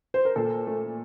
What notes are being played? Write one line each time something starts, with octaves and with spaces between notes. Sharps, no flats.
C5
A#4
A#2 A4
A3